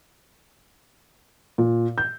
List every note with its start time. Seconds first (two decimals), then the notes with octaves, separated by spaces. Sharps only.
1.58 A#2
1.98 G6